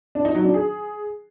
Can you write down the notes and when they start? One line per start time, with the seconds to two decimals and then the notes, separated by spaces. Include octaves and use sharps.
0.15 D4
0.25 D#4
0.35 F#3
0.44 D4
0.54 G#4